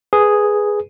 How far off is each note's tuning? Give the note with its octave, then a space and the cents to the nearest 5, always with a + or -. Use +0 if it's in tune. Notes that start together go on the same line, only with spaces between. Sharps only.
G#4 +0 B4 +0